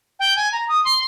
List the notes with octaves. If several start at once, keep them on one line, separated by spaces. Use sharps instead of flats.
G5
G#5
A#5
D#6
C6